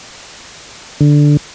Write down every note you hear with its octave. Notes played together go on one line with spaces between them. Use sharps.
D3